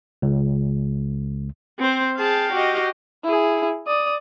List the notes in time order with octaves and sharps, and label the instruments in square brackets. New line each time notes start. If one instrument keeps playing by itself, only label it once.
[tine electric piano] C#2
[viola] C4 C5
[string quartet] G#4 A5 [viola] F5 G5
[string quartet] F#4 G4 D#5
[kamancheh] E4 G#4
D5 D#6